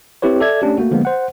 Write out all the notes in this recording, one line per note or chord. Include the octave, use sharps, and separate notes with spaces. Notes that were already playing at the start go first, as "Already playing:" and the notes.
C4 E4 G4 B4 C#5
A4 D5 E5 G#6
A3 C#4 D4 G4
A3 A#3 F#4
D3 F3 G#3 A#3 B3
C5 F#5